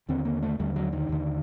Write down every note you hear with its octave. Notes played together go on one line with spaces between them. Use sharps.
D#2 D3 C4
A#3
A3
D#2 D3 G3
F#3
D#3
D#2 D3